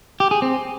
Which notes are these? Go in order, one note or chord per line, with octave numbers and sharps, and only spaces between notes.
G4
G#4
C4